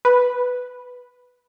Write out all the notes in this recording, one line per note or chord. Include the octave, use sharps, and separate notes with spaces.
B4